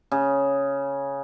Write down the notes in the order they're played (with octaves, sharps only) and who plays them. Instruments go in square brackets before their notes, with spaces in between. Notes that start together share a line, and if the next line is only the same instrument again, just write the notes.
[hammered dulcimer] C#3